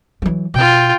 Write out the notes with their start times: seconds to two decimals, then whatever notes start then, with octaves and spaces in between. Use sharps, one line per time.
0.22 E3 F#3
0.54 B2 F4 G5